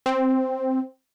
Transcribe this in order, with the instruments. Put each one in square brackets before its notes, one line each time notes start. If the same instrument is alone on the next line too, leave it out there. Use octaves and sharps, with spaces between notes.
[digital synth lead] C4